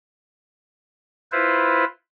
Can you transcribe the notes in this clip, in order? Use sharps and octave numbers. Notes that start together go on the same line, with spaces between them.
E4 F4 B4 C5